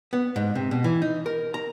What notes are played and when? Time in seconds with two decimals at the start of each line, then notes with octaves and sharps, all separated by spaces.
0.13 B3
0.36 G#2
0.55 C3
0.71 B2
0.84 E3
1.02 D#4
1.26 A#4
1.54 A#5